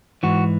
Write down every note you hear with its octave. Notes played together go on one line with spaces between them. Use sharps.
G#2 E3 F#4